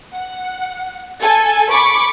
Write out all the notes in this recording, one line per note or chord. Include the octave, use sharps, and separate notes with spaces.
F#5
A4 G#5
B5 C#6 D6